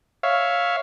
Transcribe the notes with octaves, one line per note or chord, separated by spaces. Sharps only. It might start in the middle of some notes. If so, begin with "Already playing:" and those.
C#5 E5 F5